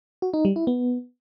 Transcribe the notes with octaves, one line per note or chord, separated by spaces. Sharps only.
F#4
D#4
G3
E4
B3